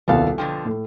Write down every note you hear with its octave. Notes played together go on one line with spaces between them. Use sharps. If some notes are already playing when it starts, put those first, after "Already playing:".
D#1 C2 B3 A4 F5
B2 D3 F3 G5
A2